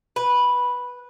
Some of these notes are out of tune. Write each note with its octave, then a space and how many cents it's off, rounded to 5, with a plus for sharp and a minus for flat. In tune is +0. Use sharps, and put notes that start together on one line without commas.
B4 -5